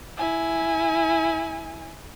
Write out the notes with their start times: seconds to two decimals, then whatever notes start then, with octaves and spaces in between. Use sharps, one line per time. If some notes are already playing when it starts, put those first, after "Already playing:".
0.17 E4 G#5